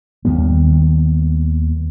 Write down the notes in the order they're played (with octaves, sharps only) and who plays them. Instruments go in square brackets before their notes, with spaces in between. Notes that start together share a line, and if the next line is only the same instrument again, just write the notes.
[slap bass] D#2 D#3 G3 B3